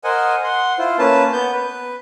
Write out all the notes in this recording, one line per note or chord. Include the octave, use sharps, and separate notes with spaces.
A#4 C5 D#5 F#5 G#5
F#5 C6
E4 F4 C5
A#3 C#4 B4 A5
B3 G6
B4